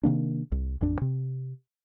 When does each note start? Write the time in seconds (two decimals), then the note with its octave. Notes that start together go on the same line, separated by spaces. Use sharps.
0.03 C3 D#3 A#3 D4
0.52 C2
0.81 A1 F2 D4
1.01 C3